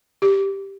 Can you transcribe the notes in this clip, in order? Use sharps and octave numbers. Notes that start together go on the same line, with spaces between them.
G4